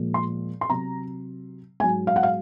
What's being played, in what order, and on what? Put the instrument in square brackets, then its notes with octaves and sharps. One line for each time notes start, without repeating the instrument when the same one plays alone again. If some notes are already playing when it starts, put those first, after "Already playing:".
Already playing: [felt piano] A#2 F3 G#3
C6
C6
C3 F#3 A#5
G#2 G#5
F#3
F5
F#5
F5